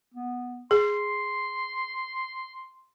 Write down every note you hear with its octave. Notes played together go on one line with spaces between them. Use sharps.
B3
G#4 C6